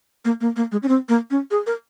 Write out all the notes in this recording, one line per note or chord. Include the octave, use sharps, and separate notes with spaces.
A#3
A#3
A#3
G#3
C#4
C4
A#3
C#4
G#4
A#4